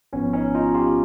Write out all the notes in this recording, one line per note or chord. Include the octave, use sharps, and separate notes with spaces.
G#1 G#2 F3 B3 C#4
C#4 D#4
D#4 F4
F4 G4